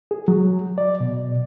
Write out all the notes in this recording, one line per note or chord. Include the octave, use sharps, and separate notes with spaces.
G#4
F#3
D5
B2